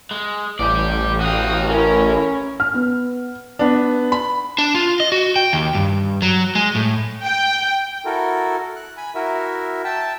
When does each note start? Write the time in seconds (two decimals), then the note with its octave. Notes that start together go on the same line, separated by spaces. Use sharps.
0.11 G#3
0.59 A1 G4 D5
1.20 F#4 F5 G5 D#6
1.69 C#4 E4 A#4
2.60 F6
2.74 B3
3.59 B3 D4
4.12 B5
4.58 D4
4.75 F4
5.00 D#5
5.12 F#4
5.36 G5
5.53 D#2
5.75 G2
6.22 F#3
6.55 G#3
6.75 A2
7.24 G5
8.05 E4 F#4 A4 A#4
8.76 F#6
8.97 G#5 B5
9.15 E4 F#4 A#4 E5
9.84 E5 G5 A5 E6